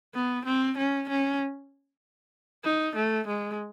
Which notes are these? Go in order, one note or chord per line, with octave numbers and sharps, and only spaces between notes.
B3
C4
C#4
C#4
D#4
A3
G#3